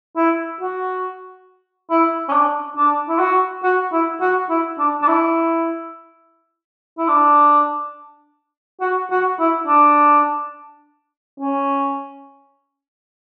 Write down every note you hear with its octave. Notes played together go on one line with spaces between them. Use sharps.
E4
F#4
E4
C#4
D4
D4
E4
F#4
F#4
E4
F#4
E4
D4
D4
E4
E4
D4
F#4
F#4
E4
D4
C#4